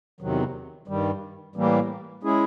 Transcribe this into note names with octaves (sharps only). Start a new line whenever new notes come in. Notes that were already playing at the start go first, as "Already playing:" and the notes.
E2 C3 D#3 F#3
G2 D#3 G3
A2 E3 G3 A#3
G#3 C#4 E4 G#4